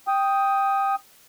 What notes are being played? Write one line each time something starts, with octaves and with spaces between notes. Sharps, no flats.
G5 D#6